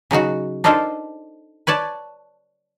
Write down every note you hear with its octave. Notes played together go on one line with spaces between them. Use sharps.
C#3 F#3 D#4 F#4
D4 D#4 F4 A4 A#4 C5
B4 C#5 D5 A5